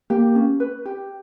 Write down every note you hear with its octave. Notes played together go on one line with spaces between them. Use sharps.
A#3 G4
C#4
B4
G4